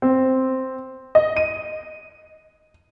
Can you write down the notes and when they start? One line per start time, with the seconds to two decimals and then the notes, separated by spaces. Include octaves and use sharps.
0.02 C4
1.15 D#5
1.36 D#7